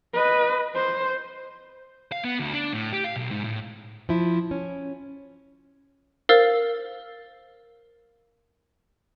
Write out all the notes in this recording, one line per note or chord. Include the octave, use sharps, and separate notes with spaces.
B4 D#5
C5
F5
B3
D2
D4
A2
G4
F5
B1
G#2
A2
F3 E4
C#4
A#4 C5 F5 E6 A6